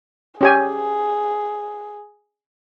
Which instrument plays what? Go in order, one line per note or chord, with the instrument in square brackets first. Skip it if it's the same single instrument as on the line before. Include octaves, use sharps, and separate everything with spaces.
[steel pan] C#4 G4 G#5 [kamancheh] G#4